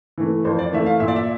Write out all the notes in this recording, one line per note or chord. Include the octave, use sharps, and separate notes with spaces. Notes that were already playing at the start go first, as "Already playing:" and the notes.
E3 A3
F2 C5
D5
E3 A3 E5
F5
A#2 E5
D5
E5